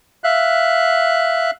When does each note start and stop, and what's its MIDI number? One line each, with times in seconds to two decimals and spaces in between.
0.24 1.51 76
0.24 1.51 77
0.24 1.51 90